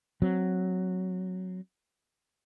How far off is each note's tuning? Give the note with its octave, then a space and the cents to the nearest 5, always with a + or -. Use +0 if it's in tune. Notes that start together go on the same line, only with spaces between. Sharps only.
F#3 +0 C4 +5